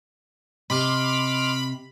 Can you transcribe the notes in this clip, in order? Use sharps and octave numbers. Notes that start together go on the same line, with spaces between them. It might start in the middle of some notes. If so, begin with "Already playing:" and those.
C3 D#5 B5 C6 D6 F6